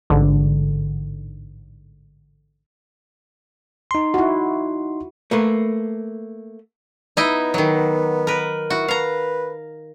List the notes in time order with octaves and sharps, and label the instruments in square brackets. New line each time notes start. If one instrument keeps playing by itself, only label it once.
[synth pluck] A1 G#2 D3
[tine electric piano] D#4 C6
[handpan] E4 F#4
[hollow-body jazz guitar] A3 A#3 B4
[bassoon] B3 [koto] D#4 E4 D#5
[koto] D#3 F#3
A#4 B4
[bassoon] E4 [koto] F#4
[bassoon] B4 [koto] F5 A#5